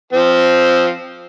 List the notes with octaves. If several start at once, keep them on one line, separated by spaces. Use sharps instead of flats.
F3 C4